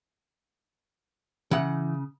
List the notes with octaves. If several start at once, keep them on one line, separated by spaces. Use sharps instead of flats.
C#3 E3 F#5